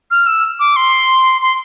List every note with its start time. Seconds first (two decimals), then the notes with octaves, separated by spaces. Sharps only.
0.11 F6
0.26 E6
0.60 D6
0.76 C6
1.42 C6